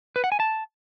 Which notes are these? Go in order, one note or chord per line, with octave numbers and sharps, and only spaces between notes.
B4
F#5
G#5
A5